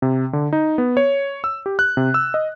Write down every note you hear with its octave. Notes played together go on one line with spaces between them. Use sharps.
C3
D3
D#4
B3
C#5
E6
G4
F#6
C3
E6
D#5